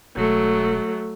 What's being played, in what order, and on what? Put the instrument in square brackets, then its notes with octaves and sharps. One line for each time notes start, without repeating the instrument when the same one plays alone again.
[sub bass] E1 [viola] F#3 A3